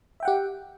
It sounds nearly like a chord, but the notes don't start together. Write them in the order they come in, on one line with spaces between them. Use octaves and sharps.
E5 G5 F#5 G4